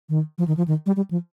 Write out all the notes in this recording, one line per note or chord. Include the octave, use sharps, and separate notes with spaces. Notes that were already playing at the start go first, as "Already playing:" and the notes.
D#3
F3
D#3
F3
D#3
G3
G3
F3